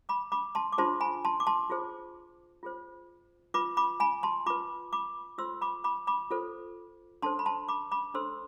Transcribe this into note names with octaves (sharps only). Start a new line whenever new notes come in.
B5 D6
B5 D6
A5 C6
D6
D4 F4 G#4 C5 A5 C6
G#5 B5
A5 C6
D6
A5 C6
F4 G#4 C5
F4 G#4 C5
F4 B4 B5 D6
B5 D6
G#5 B5
A5 C6
F4 B4 B5 D6
B5 D6
F4 A4 C5 C6 E6
B5 D6
B5 D6
B5 D6
F4 A4 C5
D4 A4 C5 A5 C6
B5
A5 C6
B5 D6
B5 D6
D4 A4 C5 C6 E6